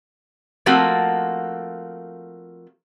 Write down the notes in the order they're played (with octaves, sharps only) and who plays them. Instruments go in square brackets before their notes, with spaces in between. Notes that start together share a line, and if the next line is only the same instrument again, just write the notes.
[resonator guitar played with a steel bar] F3 A3 A#3 C4 F#4